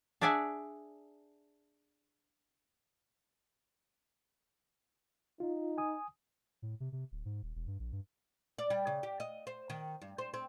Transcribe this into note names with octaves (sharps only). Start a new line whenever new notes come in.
D4 G#4 D5 E5 F#5 G#5
D#4 F4
G#5 D#6
A2
C3
C3
D1
G#2
D#1
E1
G2
A#1
G2
D5
G3
C#3
G4
D#5
C5
D#3
G2
C5
C4